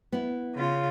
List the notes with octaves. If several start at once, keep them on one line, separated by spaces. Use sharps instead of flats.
B3 E4
C#3 F4